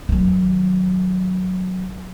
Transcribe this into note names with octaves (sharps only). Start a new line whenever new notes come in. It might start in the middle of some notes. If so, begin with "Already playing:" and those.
D#3 F#3